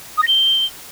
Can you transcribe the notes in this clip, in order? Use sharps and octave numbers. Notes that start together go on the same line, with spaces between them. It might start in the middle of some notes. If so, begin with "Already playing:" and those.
D#6
A#6
G7